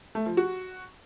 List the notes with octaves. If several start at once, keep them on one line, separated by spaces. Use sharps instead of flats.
A3
F3
F#4